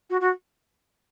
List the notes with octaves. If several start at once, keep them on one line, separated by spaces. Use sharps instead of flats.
F#4
F#4